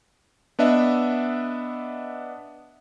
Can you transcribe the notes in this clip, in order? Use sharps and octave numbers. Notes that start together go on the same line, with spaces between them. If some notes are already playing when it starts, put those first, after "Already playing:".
B3 D4 D#5 E5